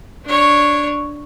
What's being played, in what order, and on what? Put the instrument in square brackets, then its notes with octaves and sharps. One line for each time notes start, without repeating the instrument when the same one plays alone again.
[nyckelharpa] D4 C#5